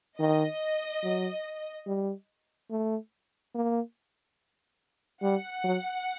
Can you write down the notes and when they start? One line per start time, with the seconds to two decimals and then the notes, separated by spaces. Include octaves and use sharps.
0.19 D#3 D#5
1.03 F#3
1.87 G3
2.71 A3
3.55 A#3
5.23 G3 F#5
5.64 F#3